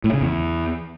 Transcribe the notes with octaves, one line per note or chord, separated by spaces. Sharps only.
A2
C#3
E2